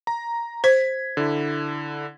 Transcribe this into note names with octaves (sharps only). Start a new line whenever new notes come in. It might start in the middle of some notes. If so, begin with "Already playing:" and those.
A#5
C5 G#6 B6
D3 E4